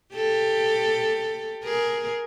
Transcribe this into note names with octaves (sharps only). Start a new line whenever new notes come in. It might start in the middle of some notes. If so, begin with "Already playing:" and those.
G4 A4
G#4 A#4